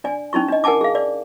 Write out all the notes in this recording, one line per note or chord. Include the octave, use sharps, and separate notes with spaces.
D4 D5 G#5
C#4 D#4 E4 C#6
D4 D#5
A#4 F#5 G#5 A5 D6
G#4 F5
D5